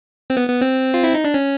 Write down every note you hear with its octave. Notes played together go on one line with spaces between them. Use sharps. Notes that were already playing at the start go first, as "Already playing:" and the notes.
C4
B3
B3
C4
F4
E4
D#4
D4
C#4